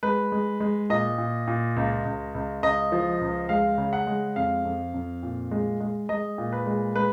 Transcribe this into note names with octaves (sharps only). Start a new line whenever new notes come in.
G#3 B4
G#3
G#3
A#2 D#5
A#2
A#2
C#2
C#2
C#2
C#2 D#5
F3
C#2
G#3 F5
C#3
F#5
G#3
F2 F5
F2
F2
A#2
G#3
G#3
G#3 D#5
A#2
B4
G#3
G#3 B4